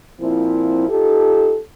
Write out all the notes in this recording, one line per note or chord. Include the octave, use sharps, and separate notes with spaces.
A#2 F3 C4 E4
D#4 F4 G4 A4